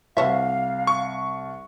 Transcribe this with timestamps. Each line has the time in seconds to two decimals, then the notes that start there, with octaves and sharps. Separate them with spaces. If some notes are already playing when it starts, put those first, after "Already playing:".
0.17 C2 C5 C#5 E5 F5
0.87 C#6